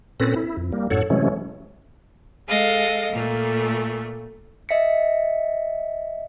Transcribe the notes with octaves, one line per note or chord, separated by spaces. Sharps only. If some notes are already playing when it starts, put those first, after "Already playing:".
A#2 C4 C#4 A4 B4 A#6
E4
F2
G3 A#3
F#2 A2 A4 C#5 F#5
C3 E3 F#3 G#3 A3 C#4
G#3 A4 D#5 F5
A#2 A3
D#5 E5 B6 C#7